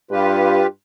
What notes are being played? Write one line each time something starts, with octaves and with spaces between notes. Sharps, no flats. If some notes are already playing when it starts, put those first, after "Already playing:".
G2 F4 G4 B4